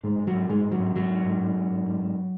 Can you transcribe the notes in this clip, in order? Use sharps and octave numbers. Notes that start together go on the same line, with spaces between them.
G#2 G#3
G#2
F#3
G#2
G#2 G#3
G#2
F#3
G#2
G#2 F#3
G#2
G#2
G#2
G#2
G#2
G#2
G#2